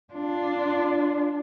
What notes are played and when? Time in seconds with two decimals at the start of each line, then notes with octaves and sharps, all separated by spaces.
0.14 D4 F4